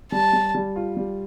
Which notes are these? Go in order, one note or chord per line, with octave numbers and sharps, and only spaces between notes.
G3 A5
G3
G3
F4
G3